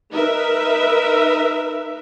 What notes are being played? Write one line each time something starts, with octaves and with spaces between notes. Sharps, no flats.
D#4 A#4 B4 E5